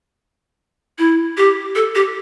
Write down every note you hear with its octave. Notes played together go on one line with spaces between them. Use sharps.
E4
G4
A4
G4